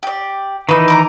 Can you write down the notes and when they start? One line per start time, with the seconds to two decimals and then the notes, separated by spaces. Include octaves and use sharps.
0.03 G4 D5
0.69 D#3 E3 D#4 B4 D#6
0.88 A#5 B5 D6